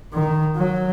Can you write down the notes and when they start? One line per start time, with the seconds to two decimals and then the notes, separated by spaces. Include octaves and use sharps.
0.14 D#3
0.56 F#3